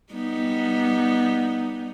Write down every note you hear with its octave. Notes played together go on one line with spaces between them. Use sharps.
G3 B3 D#4